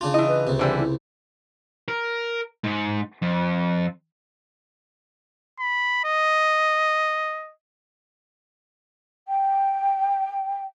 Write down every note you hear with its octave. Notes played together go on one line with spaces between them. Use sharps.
C#3 D4 F4
E3 E4 D#5
B4
C#2 C3
D3 E3 G3 C5
E4
A#4
G#2
F2
B5
D#5
G5